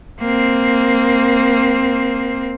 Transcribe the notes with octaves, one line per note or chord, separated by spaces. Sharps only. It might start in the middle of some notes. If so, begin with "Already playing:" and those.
A#3 C4